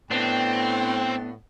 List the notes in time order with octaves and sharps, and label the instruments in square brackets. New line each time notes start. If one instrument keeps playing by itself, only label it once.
[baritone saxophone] A2 [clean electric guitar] B3 D4 [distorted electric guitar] C4 [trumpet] G5